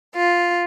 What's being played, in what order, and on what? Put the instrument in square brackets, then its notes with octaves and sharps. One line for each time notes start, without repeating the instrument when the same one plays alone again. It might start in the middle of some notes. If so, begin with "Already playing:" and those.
[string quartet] F4